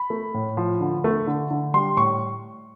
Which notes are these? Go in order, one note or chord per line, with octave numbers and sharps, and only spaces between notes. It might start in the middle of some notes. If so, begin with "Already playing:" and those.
Already playing: B5
A3
A2
F3
D3
A3
D3
D3
G3 C6
A2 C#6